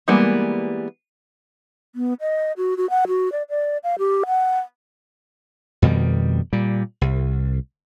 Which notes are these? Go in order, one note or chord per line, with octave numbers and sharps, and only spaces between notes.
E3 G3 G#3 A#3 B3
B3
D#5
F#4
F#4
F#5
F#4
D5
D5
F5
G4
F#5
F2 B2 D#3 G3
A#2 G3
C2